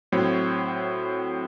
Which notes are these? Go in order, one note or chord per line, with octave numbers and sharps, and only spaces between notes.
A2 F#3 C4 C#5